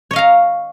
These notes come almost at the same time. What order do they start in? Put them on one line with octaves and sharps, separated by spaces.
C#5 D#5 F5 A#5